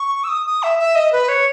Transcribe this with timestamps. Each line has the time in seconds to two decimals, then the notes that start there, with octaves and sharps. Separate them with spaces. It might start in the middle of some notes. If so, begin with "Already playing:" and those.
Already playing: C#6
0.24 E6
0.29 D#6
0.46 D#6
0.63 E5
0.79 E5
0.95 D#5
1.13 B4
1.29 C#5